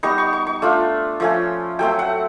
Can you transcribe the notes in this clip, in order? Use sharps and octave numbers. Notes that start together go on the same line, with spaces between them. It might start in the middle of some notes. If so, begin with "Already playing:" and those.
G3 B3 D#4 C#6
C#6
C#6
C#6
A3 D4 F4
F3 A3 C#4
F#3 A3 C4 G5
F#5